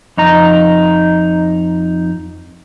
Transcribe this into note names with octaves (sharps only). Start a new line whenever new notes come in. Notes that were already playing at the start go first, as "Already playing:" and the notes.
F2 D#4 A#5